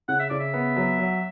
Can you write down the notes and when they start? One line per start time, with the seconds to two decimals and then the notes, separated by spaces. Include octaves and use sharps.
0.08 C#3 F#5
0.19 E5
0.29 C#3 D5
0.39 E5
0.54 B3
0.76 F#3
0.99 F#3